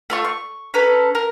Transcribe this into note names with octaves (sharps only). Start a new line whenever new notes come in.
A3 F4 C#6
C#6
C#4 A4 B4 A#5
A#4